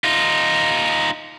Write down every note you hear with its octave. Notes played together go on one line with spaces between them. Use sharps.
D#4 F4